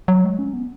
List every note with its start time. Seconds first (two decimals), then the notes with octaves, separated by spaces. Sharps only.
0.08 F#3
0.24 G#3
0.39 C#4
0.53 B3